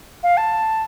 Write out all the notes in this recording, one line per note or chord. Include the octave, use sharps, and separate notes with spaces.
F5
A5